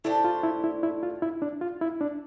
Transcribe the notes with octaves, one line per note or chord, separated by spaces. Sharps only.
A3 D4 E4 G4 C5
F4
E4
E4
E4
F4
E4
D4
F4
E4
D4